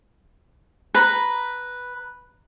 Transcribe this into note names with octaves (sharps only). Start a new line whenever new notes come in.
B4 A#5